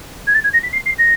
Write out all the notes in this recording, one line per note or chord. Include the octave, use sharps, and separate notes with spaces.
G#6
A6
G#6
A#6
B6
C7
C7
A#6